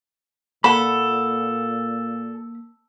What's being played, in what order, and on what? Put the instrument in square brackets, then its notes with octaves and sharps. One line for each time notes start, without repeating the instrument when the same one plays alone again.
[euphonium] A#2 [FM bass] A#3 [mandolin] A4 [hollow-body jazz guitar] F#5 B5